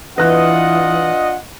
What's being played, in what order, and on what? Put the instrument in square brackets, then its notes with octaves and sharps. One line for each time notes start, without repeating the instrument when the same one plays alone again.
[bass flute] E3 [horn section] D4 F4 F#5 [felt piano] B4 F#6 [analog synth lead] D#5